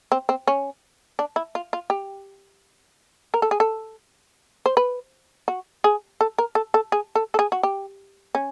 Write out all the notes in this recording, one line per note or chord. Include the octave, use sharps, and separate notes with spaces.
C4
C4
C#4
D4
E4
F4
F4
G4
A#4
A4
G#4
A4
C5
B4
F#4
G#4
A4
A#4
A4
A4
G#4
A4
A4
G#4
F#4
G4
C#4